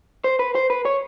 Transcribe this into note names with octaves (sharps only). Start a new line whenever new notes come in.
C5
B4
C5
B4
C#5